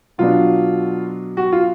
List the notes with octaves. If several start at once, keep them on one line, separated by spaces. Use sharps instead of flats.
B2 F#3 B3 D4 F4
F#4
F4